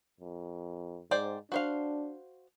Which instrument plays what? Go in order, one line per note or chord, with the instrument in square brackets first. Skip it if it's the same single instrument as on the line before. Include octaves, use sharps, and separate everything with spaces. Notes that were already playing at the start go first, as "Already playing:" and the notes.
[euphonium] F2
[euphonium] G#2 [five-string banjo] C5 D5 G5
[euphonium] D4 [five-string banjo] F#4 C5 F5